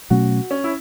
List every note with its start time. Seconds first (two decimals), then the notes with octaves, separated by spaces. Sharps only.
0.10 B2 F#3 A3 C#4 F#4
0.51 C#4
0.64 E4